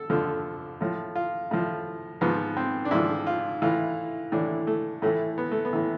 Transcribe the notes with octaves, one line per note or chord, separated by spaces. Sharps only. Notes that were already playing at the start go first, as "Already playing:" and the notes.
Already playing: A4
F2 D3 F3
A2 F3
F4
A2 F3
G#2 F3 B3
C4
D4
G#2 F3 E4
F4
A2 E3 F4
A2 E3 D4
A3
A2 E3 A3
B3
A3
B3
A2 E3